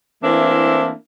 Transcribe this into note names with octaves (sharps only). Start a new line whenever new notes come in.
E3 A3 A#3 C4 D4 E4